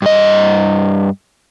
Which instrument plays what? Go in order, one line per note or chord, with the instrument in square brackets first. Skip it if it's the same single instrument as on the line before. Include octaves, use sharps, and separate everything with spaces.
[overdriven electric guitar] G2 D#5